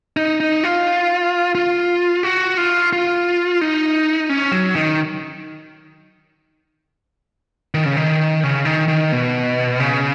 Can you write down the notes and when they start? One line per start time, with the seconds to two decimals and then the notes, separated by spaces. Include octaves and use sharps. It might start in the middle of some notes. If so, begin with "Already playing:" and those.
0.17 D#4
0.40 D#4
0.63 F4
1.55 F4
2.23 F#4
2.57 F4
2.93 F4
3.61 D#4
4.29 C#4
4.52 F#3
4.76 D#3
7.74 D#3
7.86 C#3
7.97 D#3
8.43 C#3
8.65 D#3
8.88 D#3
9.12 B2
9.80 C#3